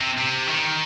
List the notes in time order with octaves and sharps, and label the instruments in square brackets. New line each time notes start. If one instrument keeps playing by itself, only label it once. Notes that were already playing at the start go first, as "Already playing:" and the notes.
[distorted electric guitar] C3
C3
D#3